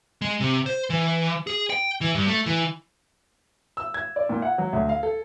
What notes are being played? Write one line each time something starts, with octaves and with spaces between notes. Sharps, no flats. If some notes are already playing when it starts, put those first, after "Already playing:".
G#3
C3
C5
E3
G#4
G5
E3
G2
A3
E3
E6
G#6
D5
A#2
F#5
F#3
D2
F5
A4